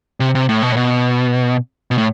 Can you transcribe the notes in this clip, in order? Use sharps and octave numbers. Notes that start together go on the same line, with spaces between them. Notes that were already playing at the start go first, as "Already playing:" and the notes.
C3
C3
A2
B2
A2
B2
B2
A2